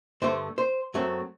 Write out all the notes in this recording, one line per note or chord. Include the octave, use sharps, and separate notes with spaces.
G2 D3 A3 C5
C5
F#2 F#3 A3 C4